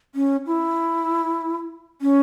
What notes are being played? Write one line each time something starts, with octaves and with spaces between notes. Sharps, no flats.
C#4
E4
C#4